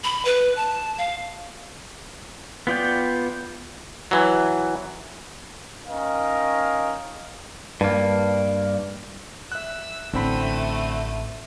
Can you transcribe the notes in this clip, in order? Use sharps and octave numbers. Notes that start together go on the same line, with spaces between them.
B5
B4
A5
F5
B3 F4 D5 G5
E3 F#3
C#4 D#4 A#4 D#5 F5 G5
G2 A#3
E5 E6 F#6
A1 D3 A3 C4 B5 D#7